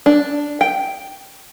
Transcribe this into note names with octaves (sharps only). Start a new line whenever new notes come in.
D4
G5